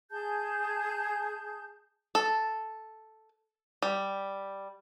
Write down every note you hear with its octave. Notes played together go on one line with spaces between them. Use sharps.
G#4 A5 G6
A4
G3